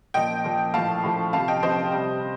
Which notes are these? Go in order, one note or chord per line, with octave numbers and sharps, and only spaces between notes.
A#2 F3 D#5 G5
A#2 F3
A2 F3 F5 A5
A2 F3
C3 F3 F5 A5
D#5 G5
C3 F3 C5 D#5
C3 G3